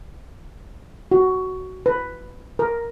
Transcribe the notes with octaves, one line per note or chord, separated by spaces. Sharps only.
F#4
B4
A#4